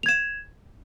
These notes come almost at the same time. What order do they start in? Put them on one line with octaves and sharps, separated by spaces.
F7 G#6 E7